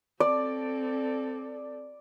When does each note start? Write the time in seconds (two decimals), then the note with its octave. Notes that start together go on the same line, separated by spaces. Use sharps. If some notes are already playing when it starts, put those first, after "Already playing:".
0.20 C4 A4 D5